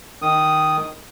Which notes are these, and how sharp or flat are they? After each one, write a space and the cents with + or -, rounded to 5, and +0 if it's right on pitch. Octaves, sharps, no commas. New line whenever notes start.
D#3 +0 D#6 +0